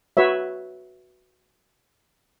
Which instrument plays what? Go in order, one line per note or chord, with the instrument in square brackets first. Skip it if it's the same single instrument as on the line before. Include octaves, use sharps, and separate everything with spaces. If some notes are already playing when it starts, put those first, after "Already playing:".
[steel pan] F#4 B4 C#5 E5